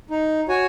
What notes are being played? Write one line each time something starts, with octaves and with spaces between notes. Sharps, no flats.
D#4
F#4 C#5 G#5